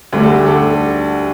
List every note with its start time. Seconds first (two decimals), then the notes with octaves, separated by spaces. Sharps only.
0.12 D2 D3 G3
0.23 A4
0.36 G4
0.46 A4